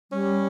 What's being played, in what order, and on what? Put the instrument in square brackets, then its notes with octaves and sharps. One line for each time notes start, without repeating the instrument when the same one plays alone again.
[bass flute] G3 [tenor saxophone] C#4